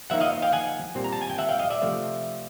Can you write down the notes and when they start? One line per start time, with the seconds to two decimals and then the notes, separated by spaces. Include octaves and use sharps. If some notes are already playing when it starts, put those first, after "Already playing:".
0.10 F3 A#3 D#4 E5 F#5
0.20 D#5 F5
0.42 F5 G5
0.52 F#5 G#5
0.95 A#2 G3 C4
1.04 A#5
1.13 A5
1.21 G#5
1.29 G5
1.38 E5 F#5
1.49 F5 G5
1.59 D#5 F5
1.70 D5 E5
1.81 C3 F3 A3 C4